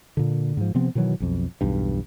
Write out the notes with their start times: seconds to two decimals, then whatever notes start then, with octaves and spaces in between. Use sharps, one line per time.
0.17 A#2 D3
0.57 G#2 F3
0.75 C3 F3 B3 C4
0.95 B2 D#3 E3 F#3
1.20 B1 F2
1.61 B1 E2 G2